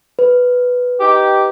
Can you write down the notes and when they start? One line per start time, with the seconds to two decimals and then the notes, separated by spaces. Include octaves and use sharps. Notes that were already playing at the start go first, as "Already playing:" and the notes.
0.19 B4
0.99 D#4 G4